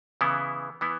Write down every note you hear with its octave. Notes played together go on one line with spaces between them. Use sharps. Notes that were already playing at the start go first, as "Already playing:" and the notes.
C#3 E3 B3 E4
E3 B3 E4